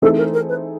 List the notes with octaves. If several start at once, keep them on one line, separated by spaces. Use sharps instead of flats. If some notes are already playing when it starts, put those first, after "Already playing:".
E3 A3 C4 D#4 G#4 A4
A#4
A#4
B4